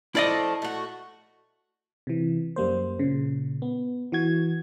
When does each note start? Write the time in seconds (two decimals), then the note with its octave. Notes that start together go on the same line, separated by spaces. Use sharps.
0.15 F3 A3 E4 A4 D5 D#5
0.62 A3 F#4
2.07 C3 E3
2.56 F#2 G3 A#3 C5
2.99 A#2 C#3
3.62 B3
4.12 E3 F#4 G#6